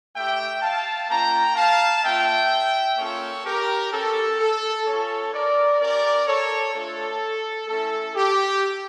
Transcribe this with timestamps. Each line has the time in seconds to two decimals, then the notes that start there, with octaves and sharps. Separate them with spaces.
0.15 A3 E4 G4 E5 G5
0.62 F5 A5
1.09 A#3 C#4 F4 G5 A#5
1.56 F5 A5
2.04 A#3 C#4 F4 E5 G5
2.97 A#3 C#4 F4 A4 C#5
3.45 G4 A#4
3.91 C#4 G4 A4
4.40 A4
4.86 C#4 F4 A4 C#5
5.33 A#4 D5
5.80 C#4 G4 A#4 D5
6.27 A4 C#5
6.74 A3 D4 F4 A4
7.69 A3 C#4 E4 A4
8.15 G4